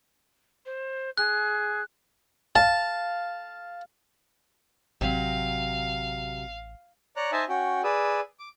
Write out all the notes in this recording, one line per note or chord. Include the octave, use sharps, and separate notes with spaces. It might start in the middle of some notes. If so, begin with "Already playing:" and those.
C5
G#4 F#6
F5 A5
A1 C3 F#3 F5
C#5 D5 A#5 F#6
D#4 C5 D#5 E5 G#5 A5
C#4 F#4 G5
G#4 B4 D5 D#6 E6
D6